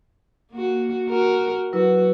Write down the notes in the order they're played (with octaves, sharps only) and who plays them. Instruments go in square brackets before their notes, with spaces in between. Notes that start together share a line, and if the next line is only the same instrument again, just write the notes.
[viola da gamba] A#3 F#4
F#4 A#4
[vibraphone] F#3 E4 B4 [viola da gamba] F#4